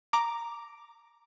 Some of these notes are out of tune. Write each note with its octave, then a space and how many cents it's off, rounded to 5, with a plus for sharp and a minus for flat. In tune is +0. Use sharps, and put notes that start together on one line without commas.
A#5 +0 D6 +0